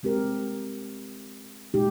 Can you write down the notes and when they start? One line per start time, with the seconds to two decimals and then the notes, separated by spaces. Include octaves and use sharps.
0.03 G#3 C4 G4 A#4
1.74 A#2 G#3 D#4 G4